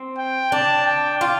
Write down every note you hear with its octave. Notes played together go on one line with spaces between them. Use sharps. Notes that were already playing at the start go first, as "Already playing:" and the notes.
Already playing: C4
G5
D4 A5
G5
F4